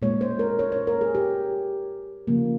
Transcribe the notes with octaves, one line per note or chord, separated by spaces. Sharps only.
A#2 G#3 C#5
C5
A#4
C#5
C#5
A#4
G#4
G4
C#3 F3 A#3